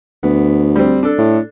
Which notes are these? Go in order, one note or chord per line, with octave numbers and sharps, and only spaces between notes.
D2 B3
G3 C4
D4 A4
A2